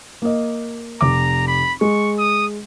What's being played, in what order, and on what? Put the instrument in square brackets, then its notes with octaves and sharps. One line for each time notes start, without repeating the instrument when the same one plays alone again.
[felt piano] A#3 D#5
[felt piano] F1 D6 [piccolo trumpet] A#5
[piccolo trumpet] B5
[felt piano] G#3 [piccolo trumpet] C#6
[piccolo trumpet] D#6